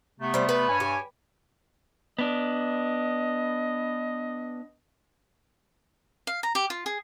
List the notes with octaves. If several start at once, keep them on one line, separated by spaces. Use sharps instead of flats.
C3 A3 B3
G3 C4
B4
G2 C#5 G#5
G4
B3 D4 D#5
F5
A#5
G4
F4
G#4